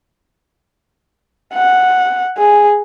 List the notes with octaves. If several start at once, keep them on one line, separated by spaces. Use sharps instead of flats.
F#5
G#4